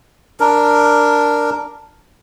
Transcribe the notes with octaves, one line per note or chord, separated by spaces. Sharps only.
D4 A#4